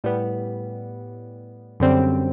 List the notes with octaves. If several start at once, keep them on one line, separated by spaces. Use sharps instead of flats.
A2 G3 B3
F#2 D3 G3 C4